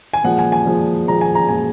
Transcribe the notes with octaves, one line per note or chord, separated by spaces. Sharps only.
G#5
A#2 F3 G#3 F#5
G#5
G#5
A#2 F3 G#3
A#2 F3 G#3 A#5
G#5
A#5
A#2 F3 G#3 G#5